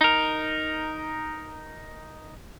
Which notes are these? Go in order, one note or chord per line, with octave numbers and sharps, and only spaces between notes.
D#4 A#4